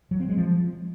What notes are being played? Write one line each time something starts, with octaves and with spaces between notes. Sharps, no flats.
F#3
C4
G#3
F3